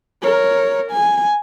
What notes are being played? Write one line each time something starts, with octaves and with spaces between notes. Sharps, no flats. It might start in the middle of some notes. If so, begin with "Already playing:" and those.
A#4 C#5
G#5